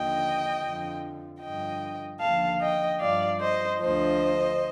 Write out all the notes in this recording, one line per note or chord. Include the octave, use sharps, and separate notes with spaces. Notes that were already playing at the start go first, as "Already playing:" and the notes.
Already playing: D#2 D3 F3 D#5 G5
F2 D3 F3
G2 D3 F3 D#5 G5
D#2 D3 F3 F5 A5
D#5 G5
G2 F3 D5 F5
C5 D#5
D2 D3 F3 C5 D#5